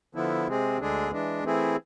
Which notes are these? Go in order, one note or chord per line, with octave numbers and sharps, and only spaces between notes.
D3 F3 B3 E4
C3 G#3 C4 G#4
D2 D3 G#3 D4 G#4
E3 G#3 D4
E3 A3 C4 E4 G#4